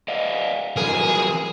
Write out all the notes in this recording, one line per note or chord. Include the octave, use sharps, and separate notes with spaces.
D5 D#5 F5
E3 F#3 G#4 A#4